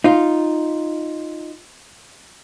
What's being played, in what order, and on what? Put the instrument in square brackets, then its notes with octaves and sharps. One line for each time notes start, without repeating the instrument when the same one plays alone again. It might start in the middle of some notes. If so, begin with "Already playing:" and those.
[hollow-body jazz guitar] D#4 F4